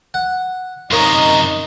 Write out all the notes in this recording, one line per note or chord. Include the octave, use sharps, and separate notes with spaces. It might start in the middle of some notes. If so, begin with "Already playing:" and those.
F#5
F#2 C3 D#4 F4 A#4 C#5 D#5 A#5